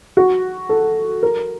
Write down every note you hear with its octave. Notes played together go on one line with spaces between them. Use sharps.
F#4
A4
A#4